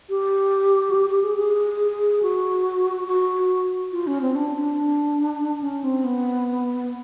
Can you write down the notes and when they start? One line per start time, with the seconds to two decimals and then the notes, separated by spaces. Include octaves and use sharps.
0.10 G4
0.90 F#4
0.95 G4
1.10 G4
1.24 G#4
1.37 G#4
2.23 F#4
3.08 F#4
3.92 F4
4.07 C#4
4.21 C4
4.35 D4
4.56 D4
5.63 C#4
5.84 C4
6.04 B3